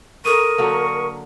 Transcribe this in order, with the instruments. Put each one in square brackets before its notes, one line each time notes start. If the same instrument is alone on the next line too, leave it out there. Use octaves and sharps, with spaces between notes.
[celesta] A4 D#6 D#7 [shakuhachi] A#4 [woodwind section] C#6
[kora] D3 F#3 A#3